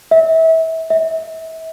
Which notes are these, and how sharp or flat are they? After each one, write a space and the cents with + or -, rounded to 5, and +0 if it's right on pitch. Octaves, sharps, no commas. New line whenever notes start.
E5 -30
E5 -35